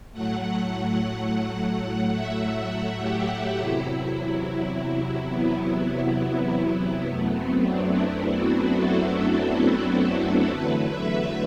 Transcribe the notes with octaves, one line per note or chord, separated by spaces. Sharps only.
A2 F#3 A3 F#5
F#5
E5
E5
F#5
G4
E2 C3 F#3 E4
B3
B3
F#2 F#3 A3 B3
C4
D4
E4
F#4
A4
E2 D3 F#3 A3 B4
E5